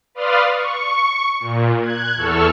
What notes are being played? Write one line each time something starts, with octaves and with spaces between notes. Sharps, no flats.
B4 D5 F5 C6 D#6 F6
C#6
A#2
F#6 G#6
E2 A4 C#6 E6 F6